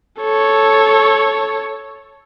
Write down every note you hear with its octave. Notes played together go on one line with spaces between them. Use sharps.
A4 C#5